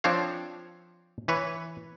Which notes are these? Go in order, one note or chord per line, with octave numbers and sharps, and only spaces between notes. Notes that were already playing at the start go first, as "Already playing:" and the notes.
F3 C4 D4 C5 C#5 F5
E3 B4 C#5